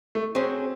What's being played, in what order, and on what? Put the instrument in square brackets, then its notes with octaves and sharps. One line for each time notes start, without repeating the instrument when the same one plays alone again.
[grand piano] A3
[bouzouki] F#3 C#4 G#4 C5 [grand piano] C4